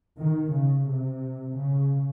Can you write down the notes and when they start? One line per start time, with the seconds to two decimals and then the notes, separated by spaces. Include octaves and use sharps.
0.18 D#3
0.52 C#3
0.88 C3
1.57 C#3